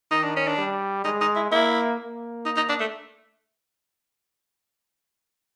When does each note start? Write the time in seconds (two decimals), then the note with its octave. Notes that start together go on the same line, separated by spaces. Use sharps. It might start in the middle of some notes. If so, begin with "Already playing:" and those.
0.11 D#3 D#4
0.24 D4
0.36 C#4
0.47 D4
0.58 G3
1.04 G#3 D#4
1.21 D#4
1.36 E4
1.51 A#3 E4
1.99 A#3
2.45 D#4
2.57 D#4
2.69 D4
2.80 A3